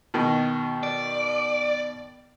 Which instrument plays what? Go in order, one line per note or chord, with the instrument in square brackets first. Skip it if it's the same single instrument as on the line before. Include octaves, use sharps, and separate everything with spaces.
[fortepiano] B2 D#3
[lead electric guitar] D5